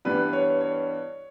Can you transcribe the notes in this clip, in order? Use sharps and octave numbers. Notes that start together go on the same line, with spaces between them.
G2 E3 G3 B3 B4
C#5
C#5